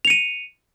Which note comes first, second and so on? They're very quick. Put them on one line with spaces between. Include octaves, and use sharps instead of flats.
F7 C#7 D#7